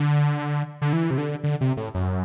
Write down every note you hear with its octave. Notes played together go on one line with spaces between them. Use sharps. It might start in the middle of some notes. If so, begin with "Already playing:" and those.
Already playing: D3
D3
E3
C3
D3
D3
C3
A2
F#2